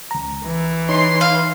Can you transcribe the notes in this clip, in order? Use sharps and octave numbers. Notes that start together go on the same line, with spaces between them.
C#2 A#5
E3
D#4 C#5 C6
F5